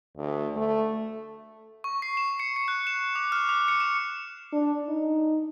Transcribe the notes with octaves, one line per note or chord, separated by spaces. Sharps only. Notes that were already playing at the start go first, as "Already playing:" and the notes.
D2
A3
C#6
C7
E7
C#7
C#7
F#6
E7
D6
F6
D6
C#7
E7
D4
D#4